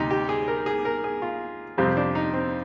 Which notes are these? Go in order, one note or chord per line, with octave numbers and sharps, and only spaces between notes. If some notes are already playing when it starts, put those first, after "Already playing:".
Already playing: D2 C3 G3 D#4
G4
G#4
A#4
G#4
A#4
G#4
F4
F2 C3 G3 C4
D4
D#4
C4